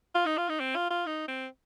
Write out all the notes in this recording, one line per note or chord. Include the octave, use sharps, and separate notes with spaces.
F4
D#4
F4
D#4
C4
F4
F4
D#4
C4